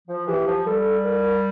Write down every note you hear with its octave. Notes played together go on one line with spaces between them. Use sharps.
F3
E3 G4
F3
G3 A4
A#4